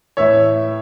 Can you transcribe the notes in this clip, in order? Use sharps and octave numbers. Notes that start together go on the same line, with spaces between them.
A2 E3 C#5 E5